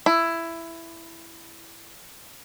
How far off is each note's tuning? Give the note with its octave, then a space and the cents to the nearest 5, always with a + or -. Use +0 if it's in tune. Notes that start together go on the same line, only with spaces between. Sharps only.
E4 +10